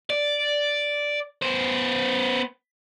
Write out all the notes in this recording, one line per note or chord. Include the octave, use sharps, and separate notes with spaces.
D5
B3 C5